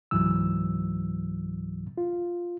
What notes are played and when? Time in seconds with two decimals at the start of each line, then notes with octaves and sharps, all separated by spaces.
0.11 C#2 G#2 E3 F#3 E6
1.98 F4